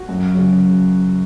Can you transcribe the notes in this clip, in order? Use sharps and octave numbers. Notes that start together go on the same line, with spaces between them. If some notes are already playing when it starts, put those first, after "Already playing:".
Already playing: F#4
F#2
C#3 F#3